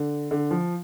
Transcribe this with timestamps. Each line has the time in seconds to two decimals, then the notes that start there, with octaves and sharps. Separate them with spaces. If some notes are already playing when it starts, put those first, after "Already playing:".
Already playing: D3
0.31 D3
0.51 F3